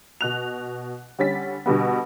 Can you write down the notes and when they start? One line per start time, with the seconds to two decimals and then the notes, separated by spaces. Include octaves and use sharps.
0.21 B2 F#6 F7
1.19 D3 G3 C#4 A6 B6
1.66 B2 D3 G3 B3